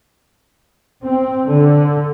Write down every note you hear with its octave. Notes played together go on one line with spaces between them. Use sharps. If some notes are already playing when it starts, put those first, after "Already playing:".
C4
D3